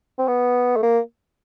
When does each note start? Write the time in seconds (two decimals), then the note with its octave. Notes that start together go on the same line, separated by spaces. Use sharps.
0.19 C4
0.28 B3
0.77 A3
0.83 A#3